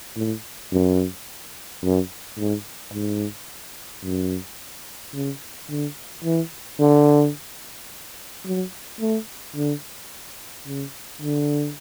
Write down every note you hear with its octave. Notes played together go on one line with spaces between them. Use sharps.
A2
F#2
F#2
G#2
G#2
F#2
C#3
D3
E3
D3
F#3
A3
D3
C#3
D3